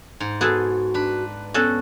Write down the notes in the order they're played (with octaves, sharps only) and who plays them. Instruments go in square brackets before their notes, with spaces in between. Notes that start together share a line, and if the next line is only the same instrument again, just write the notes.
[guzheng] G#2
[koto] B3 G#4 A4 [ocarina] F#4
[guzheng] D4 B4
[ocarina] B3 [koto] C#4 F#4 A4